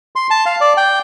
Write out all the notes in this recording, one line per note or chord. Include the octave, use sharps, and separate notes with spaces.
C6
A5
F5
D5
G5